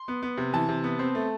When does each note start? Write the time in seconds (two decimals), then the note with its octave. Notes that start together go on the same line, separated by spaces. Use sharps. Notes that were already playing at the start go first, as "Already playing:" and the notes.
Already playing: C6
0.08 B3
0.23 B3
0.38 C3
0.53 E3 A5
0.69 C3
0.84 B3
0.99 C4
1.15 A3